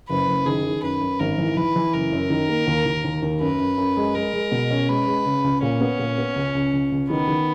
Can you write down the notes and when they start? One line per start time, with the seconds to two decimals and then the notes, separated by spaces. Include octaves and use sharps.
0.09 F#1 B4
0.28 F#1
0.46 D#3 G#4
0.64 D#3
0.83 F#2 B4
1.01 F#2
1.19 G#1 A#4
1.38 E3
1.57 E3 B4
1.76 E3
1.94 F#1 A#4
2.12 F#2
2.30 D#3
2.49 A#3
2.67 D#2
2.86 D#2
3.04 D#2
3.22 D#2
3.41 F#2 B4
3.59 F#2
3.78 F#2
3.97 G#3
4.15 G#3 A#4
4.33 G#3
4.52 B2
4.71 C#4
4.88 G#3 B4
5.07 G#3
5.26 C#3
5.44 C#2
5.62 A#2 C#4
5.81 B3
5.99 A#2
6.18 B3
6.36 C#2
6.55 C#2
6.73 C#2
6.92 C#2
7.10 D#3 B3
7.28 D#3